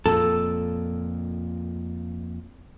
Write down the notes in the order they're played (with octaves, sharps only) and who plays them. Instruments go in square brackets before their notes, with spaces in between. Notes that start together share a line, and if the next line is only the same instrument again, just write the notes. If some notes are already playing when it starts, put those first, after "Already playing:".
[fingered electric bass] F2 A#2 [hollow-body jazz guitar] A4